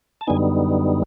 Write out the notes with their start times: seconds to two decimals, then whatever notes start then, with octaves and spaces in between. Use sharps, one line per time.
0.21 A5
0.27 F#2 D3 G3 B3 D#4 G#5